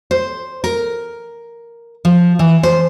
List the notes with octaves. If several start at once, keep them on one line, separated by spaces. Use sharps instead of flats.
C5
A#4
F3
E3
C5